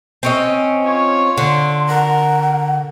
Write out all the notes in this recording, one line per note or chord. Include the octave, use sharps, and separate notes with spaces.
C4 C#4 D#5
F4 C#5
D3 C6
A#4 F#5